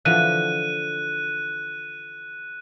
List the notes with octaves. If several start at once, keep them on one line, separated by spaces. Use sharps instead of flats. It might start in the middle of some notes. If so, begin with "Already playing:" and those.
D3 E3 F3 F#6 D#7